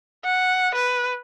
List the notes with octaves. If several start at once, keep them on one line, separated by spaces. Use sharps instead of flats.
F#5
B4